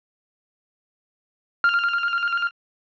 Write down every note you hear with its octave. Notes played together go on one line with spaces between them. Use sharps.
F6